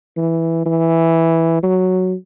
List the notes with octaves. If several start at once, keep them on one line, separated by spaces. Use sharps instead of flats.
E3
E3
F#3